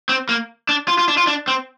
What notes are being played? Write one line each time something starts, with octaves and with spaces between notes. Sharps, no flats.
C4
A#3
D4
F4
F4
D4
F4
D4
C4